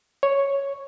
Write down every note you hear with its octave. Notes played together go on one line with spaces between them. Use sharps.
C#5